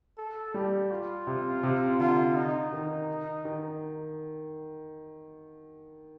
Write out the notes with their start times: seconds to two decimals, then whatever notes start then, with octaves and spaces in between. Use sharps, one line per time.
0.18 A4
0.54 G3 G4
0.91 F4
1.27 C3
1.63 C3
1.99 D3 F4
2.35 D#4
2.73 D#3
3.45 D#3